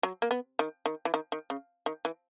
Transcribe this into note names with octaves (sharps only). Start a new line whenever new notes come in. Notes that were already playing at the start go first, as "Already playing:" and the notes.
F#3
A#3
B3
D#3
D#3
E3
D#3
D#3
C#3
D#3
E3